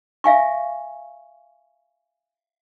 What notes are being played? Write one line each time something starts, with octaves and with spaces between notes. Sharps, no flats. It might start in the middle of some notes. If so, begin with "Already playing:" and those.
E5 F5 G#5 C#6